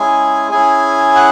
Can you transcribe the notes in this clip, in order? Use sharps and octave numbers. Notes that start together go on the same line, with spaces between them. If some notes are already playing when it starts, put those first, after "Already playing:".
Already playing: G#3 C#4 E4 G#4 G#5
C#4 E4 G#4 G#5
F#5